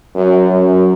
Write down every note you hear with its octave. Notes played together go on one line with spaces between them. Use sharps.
F#2
F#2